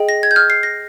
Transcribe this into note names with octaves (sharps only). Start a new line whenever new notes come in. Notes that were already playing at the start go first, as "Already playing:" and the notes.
Already playing: G#4 D#5 G5
A#6
G#6
G6
F6
C7
A#6